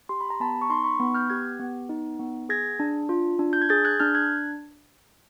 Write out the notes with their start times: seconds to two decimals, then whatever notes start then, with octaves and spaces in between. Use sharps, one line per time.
0.09 G4 C6
0.21 B5
0.30 A#5
0.40 B3 A5 B5
0.62 C#6
0.70 D#4 A#5 C6
0.84 B5 C#6
1.00 B3 B5 C#6
1.15 F6 G6
1.30 G4 F#6 G#6
1.60 B3
1.89 D#4
2.20 B3
2.49 G#4 G#6 A#6
2.80 D4
3.09 F4
3.39 D4
3.53 G6
3.62 G#6
3.69 G#4 G6 A6
3.85 F#6 G#6
4.00 D4 F6 G6
4.15 F#6 G#6